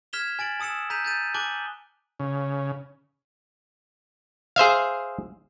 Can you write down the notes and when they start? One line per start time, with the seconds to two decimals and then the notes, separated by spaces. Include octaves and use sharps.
0.13 F6 G#6 B6 E7 F7 G7
0.39 G#5 A6 D7 F#7
0.60 A5 D#6 E6 C#7 E7
0.90 A#5 G6 B6 D#7 F7
1.05 G6 A6 D#7
1.34 G#5 A5 D6 F#6 F#7 G7
2.20 C#3
4.56 G#4 C5 E5 F5